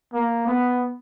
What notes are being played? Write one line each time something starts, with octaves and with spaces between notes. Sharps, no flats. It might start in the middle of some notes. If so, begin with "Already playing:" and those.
A#3
B3